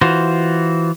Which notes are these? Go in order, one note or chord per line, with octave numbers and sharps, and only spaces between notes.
E3 F4 F#4 C5